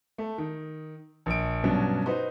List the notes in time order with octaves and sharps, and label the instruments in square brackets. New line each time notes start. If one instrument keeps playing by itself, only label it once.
[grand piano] A3
D#3
A#1 D7
G2 B2 F#3 C#4 D4
D#4 F#4 B4 C5